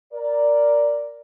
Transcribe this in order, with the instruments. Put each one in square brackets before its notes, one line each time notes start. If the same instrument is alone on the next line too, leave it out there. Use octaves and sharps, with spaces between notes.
[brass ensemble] A#4 D5